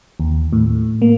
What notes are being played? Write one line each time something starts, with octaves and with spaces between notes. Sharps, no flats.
D#2
A2
A#3